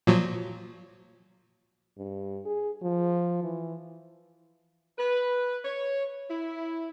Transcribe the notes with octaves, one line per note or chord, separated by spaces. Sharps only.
A#2 F3 F#3
G2
G#4
F3
E3
B4
C#5
E4